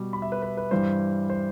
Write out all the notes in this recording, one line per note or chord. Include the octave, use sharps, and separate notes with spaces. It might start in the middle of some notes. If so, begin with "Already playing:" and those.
Already playing: B2 G3
B5
E5
B4
B4
B4
G2 E3 G3 C5
C5